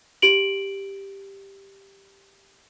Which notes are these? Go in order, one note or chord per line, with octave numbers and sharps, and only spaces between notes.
G4 D7 F#7